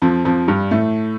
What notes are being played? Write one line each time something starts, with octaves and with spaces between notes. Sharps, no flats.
F2 F3
F2 F3
G2 G3
A2 A3